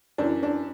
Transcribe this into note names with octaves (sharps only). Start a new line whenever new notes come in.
F#2 E3 D4
D4